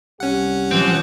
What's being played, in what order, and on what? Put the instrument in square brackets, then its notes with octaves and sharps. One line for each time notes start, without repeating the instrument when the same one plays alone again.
[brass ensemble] C2 G4 [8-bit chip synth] C#4 F#5
[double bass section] E3 F3 [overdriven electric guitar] C4